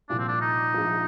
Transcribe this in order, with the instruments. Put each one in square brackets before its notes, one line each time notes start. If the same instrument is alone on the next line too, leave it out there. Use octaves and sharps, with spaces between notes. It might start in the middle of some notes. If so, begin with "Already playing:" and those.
[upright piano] C2 A#2 F3 [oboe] D4
[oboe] C4
D4
D#4
[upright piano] A#1 G#2 F3